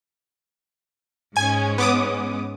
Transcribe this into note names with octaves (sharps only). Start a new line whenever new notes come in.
G#2 G#3 C#4 G#5 G#6
B3 D6 D#6